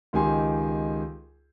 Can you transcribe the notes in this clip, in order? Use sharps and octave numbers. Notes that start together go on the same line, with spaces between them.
C#2 D#3 G4 G#5 C6